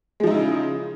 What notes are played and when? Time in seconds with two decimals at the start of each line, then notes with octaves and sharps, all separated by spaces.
0.20 G#3
0.23 F3
0.27 D#4
0.30 E4
0.34 C#3